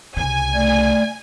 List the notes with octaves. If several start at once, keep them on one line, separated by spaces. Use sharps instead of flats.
C2 C#3 G#5
A3 D5